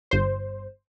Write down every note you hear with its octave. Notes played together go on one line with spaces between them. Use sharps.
G1 C5